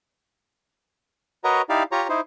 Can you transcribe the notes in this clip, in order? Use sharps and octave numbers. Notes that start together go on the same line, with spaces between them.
F#4 A#4 B4 C#5 D#5 A#5
D#4 E4 G4 D5 F5
F4 G4 C#5 A#5
D#4 E4 C5